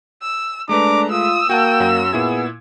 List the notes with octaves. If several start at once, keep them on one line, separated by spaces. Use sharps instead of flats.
E6
G#3 A3 D4 B4 A#5 D6
F4 D#6 E6
A#3 F#4 F#5 G5 A5
F#2 C#4 F#4
A#2 B3 E4 G#4 G#6